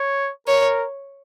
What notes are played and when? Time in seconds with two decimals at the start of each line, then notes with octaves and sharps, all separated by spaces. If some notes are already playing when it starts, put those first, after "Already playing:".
Already playing: C#5
0.47 A#4 C#5